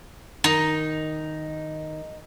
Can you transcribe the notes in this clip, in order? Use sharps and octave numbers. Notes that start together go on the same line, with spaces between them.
D#3 D#4